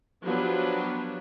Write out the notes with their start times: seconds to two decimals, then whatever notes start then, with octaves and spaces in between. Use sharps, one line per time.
0.25 F3 F#3 B3 D4 G4 B4